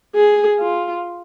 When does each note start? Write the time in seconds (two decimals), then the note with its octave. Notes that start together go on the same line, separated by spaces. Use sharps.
0.15 G#4
0.60 F4